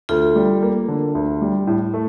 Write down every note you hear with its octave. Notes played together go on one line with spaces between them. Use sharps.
D2 F4 A4
G3
A#3
D3
D2
G3
A2
A3